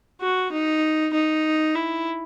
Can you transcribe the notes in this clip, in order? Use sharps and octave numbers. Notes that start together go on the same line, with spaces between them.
F#4
D#4
D#4
E4